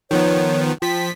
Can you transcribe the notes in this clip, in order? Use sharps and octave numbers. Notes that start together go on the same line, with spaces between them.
D#3 F3 B3 C#5
F3 G5 B6